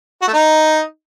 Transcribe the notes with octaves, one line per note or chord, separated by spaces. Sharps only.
F#4
A3
D#4